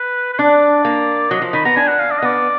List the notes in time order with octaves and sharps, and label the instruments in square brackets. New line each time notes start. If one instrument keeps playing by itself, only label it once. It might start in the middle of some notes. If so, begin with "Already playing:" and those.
Already playing: [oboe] B4
B4
[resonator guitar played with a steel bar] D4 [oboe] D5
[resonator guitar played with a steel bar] A#3
[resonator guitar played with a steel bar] F#3 [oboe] D#5
[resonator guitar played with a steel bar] F3
[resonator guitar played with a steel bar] D#3 [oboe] B5
[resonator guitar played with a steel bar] B3 [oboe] A#5
[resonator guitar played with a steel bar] D4 [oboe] G#5
[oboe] F#5
F5
D5
D#5
[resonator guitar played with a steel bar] B3 [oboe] D5